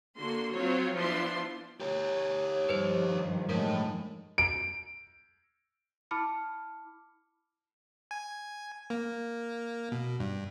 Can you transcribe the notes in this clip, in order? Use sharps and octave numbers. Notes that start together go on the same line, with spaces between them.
D3 A#3 F#4 C6
F#3 C4 F4 C#5
F3 B3 D4 E4 B4 C6
G4 A#4 C#5
G2 D#3 F3 B4 C5
A2 G#3 A#4
D7
E4 A5 B5 D6 F6 C#7
G#5
A#3
B2
G2